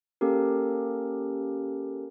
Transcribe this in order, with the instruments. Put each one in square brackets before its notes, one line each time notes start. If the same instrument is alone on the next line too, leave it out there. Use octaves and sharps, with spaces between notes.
[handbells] A#3 C#4 G4 A4 A#4